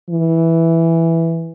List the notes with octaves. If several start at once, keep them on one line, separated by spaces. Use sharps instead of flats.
E3